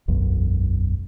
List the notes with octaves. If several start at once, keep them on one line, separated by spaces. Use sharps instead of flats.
E1 B1 F#2